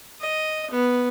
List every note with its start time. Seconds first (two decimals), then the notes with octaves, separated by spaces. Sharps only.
0.20 D#5
0.71 B3